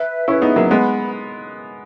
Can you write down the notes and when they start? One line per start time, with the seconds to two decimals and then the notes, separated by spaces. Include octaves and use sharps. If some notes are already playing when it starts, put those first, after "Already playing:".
Already playing: B4 E5
0.28 C#4 E4 G#4 B4 E5
0.42 B3 D#4
0.56 F#3 A#3
0.71 G#3 B3 B4 F#5 B5